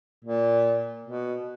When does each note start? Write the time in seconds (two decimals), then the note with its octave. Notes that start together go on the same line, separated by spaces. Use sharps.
0.24 A#2
1.06 B2